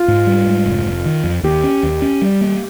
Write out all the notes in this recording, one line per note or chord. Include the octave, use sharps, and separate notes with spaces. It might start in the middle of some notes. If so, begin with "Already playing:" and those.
Already playing: F4
G#2
G3
G#2
F1
F1
D#3
F2
D#2 G4
C#4
D#2
C#4
G3
A#3